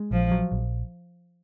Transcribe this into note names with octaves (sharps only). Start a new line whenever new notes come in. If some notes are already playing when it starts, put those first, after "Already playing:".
Already playing: G#3
A#1 F3
F#3
A#1